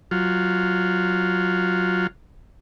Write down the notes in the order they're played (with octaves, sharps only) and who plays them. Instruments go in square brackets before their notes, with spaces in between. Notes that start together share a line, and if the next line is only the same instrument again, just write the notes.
[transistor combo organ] F#3 F4